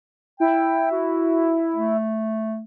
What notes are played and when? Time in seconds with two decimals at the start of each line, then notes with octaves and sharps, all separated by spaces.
0.40 E4 G5
0.92 F#4
1.76 A3